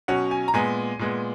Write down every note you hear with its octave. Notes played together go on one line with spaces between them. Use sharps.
B2 F#3 C#4 F#5
G#5
A#5
A#2 G#3 B3 G#5
A#2 G#3 B3